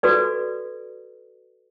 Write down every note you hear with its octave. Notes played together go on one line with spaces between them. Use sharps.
F#4 A4 B4 D5